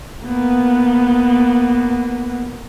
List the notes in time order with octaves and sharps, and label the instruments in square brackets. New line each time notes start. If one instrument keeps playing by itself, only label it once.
[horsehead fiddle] A#3 B3